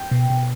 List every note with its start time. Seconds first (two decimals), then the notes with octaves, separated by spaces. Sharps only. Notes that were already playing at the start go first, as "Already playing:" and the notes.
Already playing: G5
0.11 B2
0.30 B2